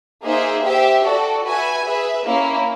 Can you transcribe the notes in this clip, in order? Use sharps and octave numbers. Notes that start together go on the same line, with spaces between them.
A#3 D#4 G#4 C5 E5
G4 C5 E5 G5
F#4 A4 D5
F#4 B4 E5 G#5
G#4 B4 E5
A#3 C#4 E4